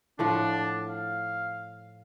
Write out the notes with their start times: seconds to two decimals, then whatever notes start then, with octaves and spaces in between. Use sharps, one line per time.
0.19 A2 F3 D4 F#5
0.89 F5